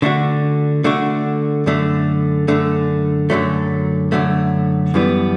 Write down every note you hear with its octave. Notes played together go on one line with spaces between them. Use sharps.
D3 A3 D4 F#4
D3 A3 D4 F#4
F#2 D3 A3
F#2 D3 A3
F#2 D3 F#3 A3
F#2 D3 F#3 A3
F#2 E3 G3 B3